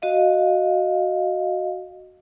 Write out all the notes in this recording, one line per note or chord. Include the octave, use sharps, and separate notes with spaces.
F#4 D#5 F5